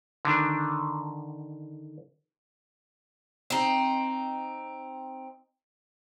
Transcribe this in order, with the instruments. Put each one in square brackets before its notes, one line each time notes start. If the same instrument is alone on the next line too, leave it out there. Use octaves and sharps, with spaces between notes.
[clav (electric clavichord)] D3 D#3 D4
[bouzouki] C4 D#4